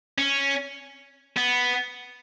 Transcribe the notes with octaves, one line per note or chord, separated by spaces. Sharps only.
C#4
B3